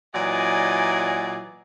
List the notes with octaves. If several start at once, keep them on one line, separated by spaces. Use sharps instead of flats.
A#2 E3 F#3 D5 D#5 G#5